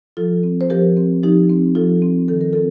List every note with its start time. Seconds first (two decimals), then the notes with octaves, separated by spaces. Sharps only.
0.17 F3 F4 A4
0.43 C4
0.61 C5
0.70 F3 G4 A#4
0.97 C4
1.23 F3 D#4 G4
1.49 C4
1.75 F3 F4 A4
2.02 C4
2.28 D#3 A4
2.41 A#4
2.52 C4 F4 A4